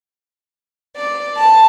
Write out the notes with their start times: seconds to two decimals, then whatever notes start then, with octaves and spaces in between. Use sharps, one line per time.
0.95 D5
1.37 A5